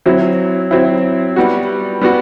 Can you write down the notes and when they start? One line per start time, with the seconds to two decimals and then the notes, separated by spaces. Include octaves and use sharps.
0.06 F#3 C4 E4
0.71 F#3 C4 E4
1.36 G3 B3 F#4
2.01 G3 B3 F#4